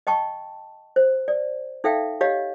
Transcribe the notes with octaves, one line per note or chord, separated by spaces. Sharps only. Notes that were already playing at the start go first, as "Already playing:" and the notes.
D#5 G5 A5 C#6
C5
D5
D#4 A4 E5 F5 G5
G4 C#5 D#5 F5